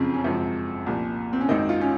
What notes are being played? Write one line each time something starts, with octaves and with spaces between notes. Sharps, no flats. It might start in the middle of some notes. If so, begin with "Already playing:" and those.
Already playing: F#1 F2 C#3 F3 C4
C#4
G#1 F#2 C#3 F3 C4
C2 A#2 F3
C4
C#4
G#1 F#2 D#3 D#4
F4
C#4